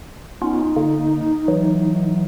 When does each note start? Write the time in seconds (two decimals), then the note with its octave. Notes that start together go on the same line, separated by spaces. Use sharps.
0.42 B3 C#4 D#4 F4
0.76 D3 A#3
1.48 E3 F#3